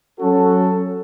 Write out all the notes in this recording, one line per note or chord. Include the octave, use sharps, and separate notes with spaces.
F#3 C#4 F#4 A4